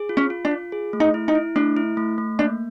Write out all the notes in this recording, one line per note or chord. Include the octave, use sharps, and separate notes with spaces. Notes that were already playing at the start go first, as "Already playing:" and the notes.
Already playing: G#4
F4
C#4
F4
D4
F4
G#4
A3
D#4
E4
D#4
E4
A3 D4
E4
A3
A3
A#3 D4